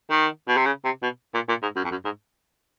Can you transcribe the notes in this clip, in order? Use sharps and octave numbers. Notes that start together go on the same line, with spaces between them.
D#3
B2
C3
C#3
C3
B2
A#2
A#2
G#2
F#2
F2
F#2
G#2